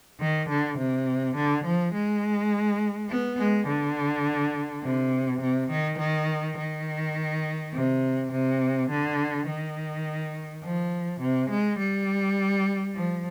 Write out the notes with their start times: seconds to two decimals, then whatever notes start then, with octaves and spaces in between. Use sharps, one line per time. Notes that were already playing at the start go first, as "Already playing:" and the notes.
0.20 D#3
0.49 D3
0.78 C3
1.35 D3
1.65 F3
1.93 G#3
3.09 B3
3.39 G#3
3.67 D3
4.83 C3
5.41 C3
5.70 D#3
5.99 D#3
6.57 D#3
7.73 C3
8.32 C3
8.90 D3
9.47 D#3
10.64 F3
11.20 C3
11.50 G#3
11.79 G3
12.95 F3